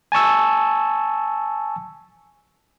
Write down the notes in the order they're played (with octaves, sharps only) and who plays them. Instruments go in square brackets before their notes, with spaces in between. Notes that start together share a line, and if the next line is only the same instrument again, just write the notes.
[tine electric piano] G#5 A5 C#6 E6